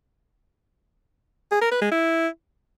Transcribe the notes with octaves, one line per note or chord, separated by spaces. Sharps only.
G#4
A#4
B4
G#3
E4